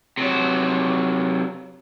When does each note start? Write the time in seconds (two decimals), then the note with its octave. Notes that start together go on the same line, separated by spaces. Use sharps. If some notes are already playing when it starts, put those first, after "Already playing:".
0.18 C3 F#3